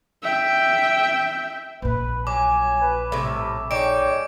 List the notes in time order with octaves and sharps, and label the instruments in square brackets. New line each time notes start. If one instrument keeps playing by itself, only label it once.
[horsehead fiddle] E5 G5
[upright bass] A#1 A#2 [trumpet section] B4
[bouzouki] F#3 [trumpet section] G#5 [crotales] D6
[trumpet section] B4
[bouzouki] A2 C3 [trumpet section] G3 E5
[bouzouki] G3 D#4 [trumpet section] G#4 C#5 G5 [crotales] D6 D7